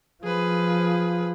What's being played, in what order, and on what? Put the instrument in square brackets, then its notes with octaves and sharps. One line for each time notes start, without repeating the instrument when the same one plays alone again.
[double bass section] F3 [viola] G#4 B4